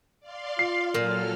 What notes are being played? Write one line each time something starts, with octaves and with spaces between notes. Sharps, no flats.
D5 F5 C6
F4 C7
A#2 F#3 A4 F6